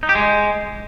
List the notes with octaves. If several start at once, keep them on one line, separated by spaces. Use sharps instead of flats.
D#4
G4
G#3